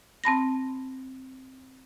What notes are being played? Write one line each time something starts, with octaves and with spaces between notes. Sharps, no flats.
C4 A5 B5 A#6